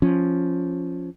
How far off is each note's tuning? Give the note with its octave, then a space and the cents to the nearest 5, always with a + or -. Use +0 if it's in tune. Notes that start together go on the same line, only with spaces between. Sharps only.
F3 +0 C#4 +0